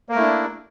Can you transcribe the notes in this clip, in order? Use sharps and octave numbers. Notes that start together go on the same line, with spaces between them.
A3 A#3 D4 E4 A#4